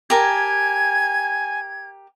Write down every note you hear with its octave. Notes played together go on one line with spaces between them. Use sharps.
G4 A#4 G#5 A5 G#6